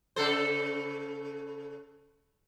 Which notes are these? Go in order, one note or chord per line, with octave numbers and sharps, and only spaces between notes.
C#3 A4 C5